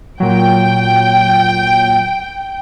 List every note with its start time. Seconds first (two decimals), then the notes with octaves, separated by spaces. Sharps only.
0.20 A#2 F#3 G5